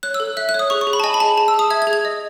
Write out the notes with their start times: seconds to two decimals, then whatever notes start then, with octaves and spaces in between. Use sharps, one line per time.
0.03 C#5 F#6
0.14 E6
0.20 A4
0.37 E5 F#6
0.49 F#6
0.54 C#5
0.59 D#6
0.70 G#4 C#6
0.81 C#6
0.87 G#4
0.93 B5
1.00 A5
1.04 D#5 G#5
1.14 B5
1.20 G#4 A5
1.37 G#4 A5
1.48 E6
1.54 G#4 D#6
1.70 E5 G#6
1.82 G#6
1.87 G#4
1.93 G#6
2.05 D#5